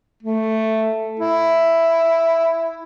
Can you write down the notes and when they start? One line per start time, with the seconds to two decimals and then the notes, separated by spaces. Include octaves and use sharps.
0.23 A3
1.19 E4